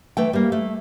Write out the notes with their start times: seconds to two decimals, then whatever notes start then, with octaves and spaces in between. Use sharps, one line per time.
0.17 E3 A3 G5
0.33 G3 A#3
0.52 A3